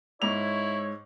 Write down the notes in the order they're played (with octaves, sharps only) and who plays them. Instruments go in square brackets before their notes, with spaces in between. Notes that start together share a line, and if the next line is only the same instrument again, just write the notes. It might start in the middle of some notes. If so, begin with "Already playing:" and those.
[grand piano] G#2 D6 F7 [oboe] E4 [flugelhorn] C#5